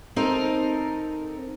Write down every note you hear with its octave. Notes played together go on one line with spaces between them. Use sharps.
C4 D#4 A4 A#4